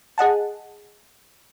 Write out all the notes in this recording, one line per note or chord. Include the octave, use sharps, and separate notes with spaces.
G#4 D#5 F#5 A5